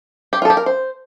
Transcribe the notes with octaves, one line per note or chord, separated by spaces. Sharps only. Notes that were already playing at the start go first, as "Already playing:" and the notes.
G4
F4
A4
G4
A#4
C5